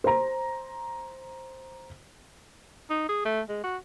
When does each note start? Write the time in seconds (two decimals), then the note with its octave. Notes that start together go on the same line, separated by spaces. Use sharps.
0.04 C5 A#5
2.90 D#4
3.09 G#4
3.25 A3
3.49 G#3
3.64 F#4